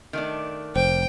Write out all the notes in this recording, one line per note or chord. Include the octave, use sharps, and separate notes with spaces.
D#3 A3 D4
F1 C5 G5